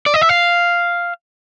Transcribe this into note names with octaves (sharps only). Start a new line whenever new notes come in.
D5
D#5
E5
F5